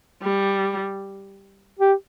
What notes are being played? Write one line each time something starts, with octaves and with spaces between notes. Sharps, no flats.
G3
G4